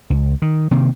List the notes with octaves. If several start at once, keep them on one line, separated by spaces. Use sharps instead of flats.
C#2
D#3
C3 D#3 A#3